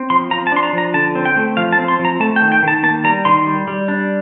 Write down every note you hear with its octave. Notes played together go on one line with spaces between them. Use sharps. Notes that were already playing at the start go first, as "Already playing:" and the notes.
Already playing: C4
F3 C6
F3 A#5
A5
D4 C6
A#5
F3
A#5
D3 A5
C4
G5
A3
F3 F5
A5
C4
C6
F3
A#5
A3 A5
G5
D#3
G5
D#3 A5
A#3 A5
G3 A#5
D#3 C6
G3
G3
D4